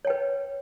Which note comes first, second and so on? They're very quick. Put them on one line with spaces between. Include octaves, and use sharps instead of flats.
C#5 G5 B4